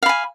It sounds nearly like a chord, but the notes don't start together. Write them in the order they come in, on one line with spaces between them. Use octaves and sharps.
F5 B5 G#5